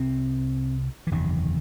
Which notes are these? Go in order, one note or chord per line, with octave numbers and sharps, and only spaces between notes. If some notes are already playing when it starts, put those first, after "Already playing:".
Already playing: C2 C3 C4
E3
F#1 E2 C3 D#3